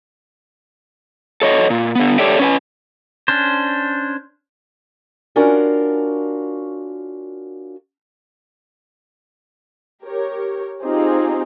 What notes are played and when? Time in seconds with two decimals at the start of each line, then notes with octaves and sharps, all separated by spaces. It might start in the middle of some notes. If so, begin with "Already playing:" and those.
1.42 A4 C#5 D#5
1.70 A#2
1.95 D3 B3
2.18 G4 A4 C#5 D5 E5 G5
2.40 C#4 B4 G#5
3.28 C#4 D4 C5
5.36 C#4 D4 F4 F#4 A#4
10.04 G4 A#4 C#5
10.82 C4 D#4 F4 G4 G#4 C5